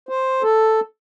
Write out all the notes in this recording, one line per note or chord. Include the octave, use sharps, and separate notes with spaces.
C5
A4